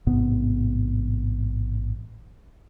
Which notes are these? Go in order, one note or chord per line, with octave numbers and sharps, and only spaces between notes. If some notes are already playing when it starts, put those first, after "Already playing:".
A1 G#2 C3 B3